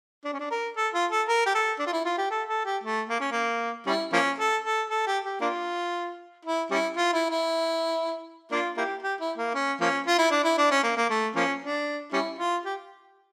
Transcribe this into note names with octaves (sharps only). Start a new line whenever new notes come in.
D4
C#4
D4
A#4
A4
F4
A4
A#4
G4
A4
D4
F4
E4
F4
G4
A4
A4
G4
A3
A#3
C#4
A#3
G3 C#4 E4
F3 A#3 C#4
A4
A4
A4
G4
G4
A#3 D4 F4
E4
G3 C#4 E4
F4
E4
E4
A#3 D4 F4
A#3 E4 G4
G4
E4
A#3
C#4
F3 A#3 C#4
F4
E4
D4
E4
D4
C#4
A#3
A#3
A3
F3 A#3 C#4
D4
G3 C#4 E4
F4
G4